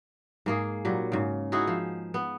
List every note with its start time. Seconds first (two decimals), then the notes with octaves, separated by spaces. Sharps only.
0.46 G#2 A#3 G#4
0.85 A#2 F#3 G3
1.12 G#2 C#3
1.52 D#4 E4 F#4 G#4
1.67 F3
2.14 B3